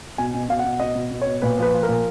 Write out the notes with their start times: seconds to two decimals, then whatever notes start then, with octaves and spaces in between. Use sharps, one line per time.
0.18 B2 G#5
0.34 B2
0.49 B2 F5
0.59 F#5
0.65 B2
0.80 B2 D#5
0.95 B2
1.11 B2
1.22 B2 C#5
1.42 A#2 B4
1.58 F3 B4
1.73 F3
1.83 A#4
1.88 A#2